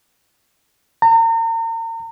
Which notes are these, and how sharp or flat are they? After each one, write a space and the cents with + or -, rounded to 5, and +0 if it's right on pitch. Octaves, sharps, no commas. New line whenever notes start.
A#5 -40